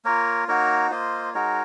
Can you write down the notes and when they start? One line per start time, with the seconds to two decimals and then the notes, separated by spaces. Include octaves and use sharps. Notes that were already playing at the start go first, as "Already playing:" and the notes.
0.05 A#3 F4 A#4 C#5
0.48 A#3 D#4 F#4 A#4 C#5
0.91 A#3 F4 C5 D#5
1.34 G#3 D#4 F#4 A#4 C#5